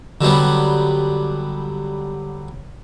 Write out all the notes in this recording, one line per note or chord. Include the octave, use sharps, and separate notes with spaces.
D3 F#3 G3 B3